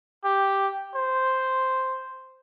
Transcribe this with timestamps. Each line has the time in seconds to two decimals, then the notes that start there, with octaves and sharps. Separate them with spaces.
0.24 G4
0.95 C5